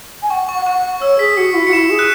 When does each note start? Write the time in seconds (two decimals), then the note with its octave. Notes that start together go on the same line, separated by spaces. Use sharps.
0.22 G#5
0.30 F#5 C#6
0.49 C#6
0.55 F#5
0.65 F#5 C#6
0.78 F#5
1.01 C#5 E6
1.19 G#4 B6
1.37 F#4 C#7
1.55 E4
1.67 F#4 C#7
1.73 E4 E7
1.90 G#4
1.99 F#6